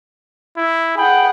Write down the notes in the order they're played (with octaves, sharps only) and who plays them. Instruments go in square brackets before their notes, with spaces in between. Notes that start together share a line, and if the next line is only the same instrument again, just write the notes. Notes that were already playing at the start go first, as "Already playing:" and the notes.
[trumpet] E4
[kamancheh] G#4 F#5 [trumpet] G5 [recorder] B5